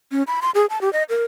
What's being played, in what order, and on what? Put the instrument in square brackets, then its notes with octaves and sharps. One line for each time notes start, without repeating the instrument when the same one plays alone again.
[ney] C#4
B5
C6
G#4
A5
G4
D#5
A#4